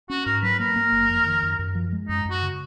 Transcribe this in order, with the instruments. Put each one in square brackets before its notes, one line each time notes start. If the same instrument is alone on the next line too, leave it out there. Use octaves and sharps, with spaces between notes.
[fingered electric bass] C#4 [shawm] F#4
[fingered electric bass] G#2 [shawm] A#4
[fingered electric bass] F#3 [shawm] B4
[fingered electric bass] A#3 [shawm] A#4
[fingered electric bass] A#3
F#1
F2
D#3
F#2
F#2
F3
G#3
[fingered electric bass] F#2 [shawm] D#4
[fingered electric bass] F#2
[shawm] F#4
[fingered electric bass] C#3